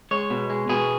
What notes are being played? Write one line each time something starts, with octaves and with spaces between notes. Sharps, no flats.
G#3 C#5
B2
G#3
B2 G#4